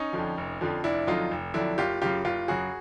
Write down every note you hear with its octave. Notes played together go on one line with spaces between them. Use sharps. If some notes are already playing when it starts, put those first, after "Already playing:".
Already playing: C#4 D#4
F2 D3 F3
F1
F2 D3 F3
F1 D4 E4
F2 D3 F#3 D#4 F4
F1
F2 D3 F#3 D4 E4
F#1 F4 G4
F#2 C#3 F4 G4
F#1 F4 G4
F#2 C#3 F#4 G#4